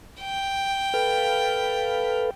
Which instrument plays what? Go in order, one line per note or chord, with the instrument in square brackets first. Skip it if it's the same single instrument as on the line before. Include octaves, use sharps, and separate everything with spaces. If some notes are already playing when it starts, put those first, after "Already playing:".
[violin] G5
[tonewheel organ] A4 B4 F5